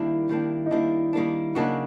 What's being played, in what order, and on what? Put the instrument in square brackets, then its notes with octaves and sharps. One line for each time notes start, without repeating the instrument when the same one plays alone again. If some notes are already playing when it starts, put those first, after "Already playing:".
Already playing: [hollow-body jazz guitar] D#3 G3 A#3 D4 [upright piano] E4
[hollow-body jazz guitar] D#3 G3 A#3 D4
[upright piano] D#4
[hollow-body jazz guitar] D#3 G3 A#3 D4 [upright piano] E4
[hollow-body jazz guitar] D#3 G3 A#3 D4
[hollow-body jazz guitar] C#3 F#3 A#3 D4 F#4 [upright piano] D#4